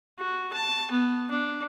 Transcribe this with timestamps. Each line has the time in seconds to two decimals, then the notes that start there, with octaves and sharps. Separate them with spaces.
0.19 F#4
0.52 A5
0.91 B3
1.30 D4